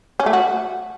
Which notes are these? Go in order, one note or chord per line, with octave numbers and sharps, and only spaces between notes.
C#4
A3
F#4